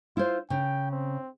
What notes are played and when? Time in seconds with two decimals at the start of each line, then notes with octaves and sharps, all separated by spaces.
0.17 E4 F4 C5
0.50 C#3 G5
0.92 C4